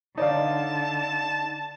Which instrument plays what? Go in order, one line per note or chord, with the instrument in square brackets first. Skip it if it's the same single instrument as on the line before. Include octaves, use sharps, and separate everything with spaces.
[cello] D3 [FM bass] D#4 [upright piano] C#5 D5 F5 [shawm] A5